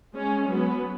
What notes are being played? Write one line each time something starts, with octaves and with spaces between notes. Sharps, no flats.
G#3 C#4
F#3 B3